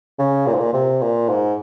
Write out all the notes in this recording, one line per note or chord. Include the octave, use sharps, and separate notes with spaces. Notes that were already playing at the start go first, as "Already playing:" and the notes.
C#3
A#2
G#2
A#2
C3
A#2
G#2